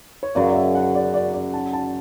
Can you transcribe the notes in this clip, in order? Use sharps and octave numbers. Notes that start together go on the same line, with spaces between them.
C#5
F#2 C#3 F#3 D5
D5
E5
F#5
D5
D5
D5
A5
A5